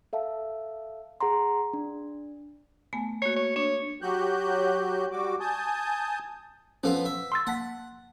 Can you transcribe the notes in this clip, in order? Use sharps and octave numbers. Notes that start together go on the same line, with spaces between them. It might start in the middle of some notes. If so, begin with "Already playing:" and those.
A4 E5 F5 A5
G#4 F#5 A#5 C6
D4
A3 B3 G#5
A#3 F#4 C#5
C#5
D4 C#5
F#3 F#4 G4 F#6 G6
G3 F#4 D6
G#5 A5 D#6 G6
F3 B3 C#4 F4 A4
E5
C6 E6 A6
A#3 F#5 A5 B6